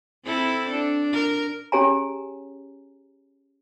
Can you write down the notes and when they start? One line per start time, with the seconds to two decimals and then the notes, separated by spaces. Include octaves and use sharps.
0.25 C4 E4 A4
0.70 D4
1.13 A#4
1.72 C#4 G4 G#4 C#5 G#5 A#5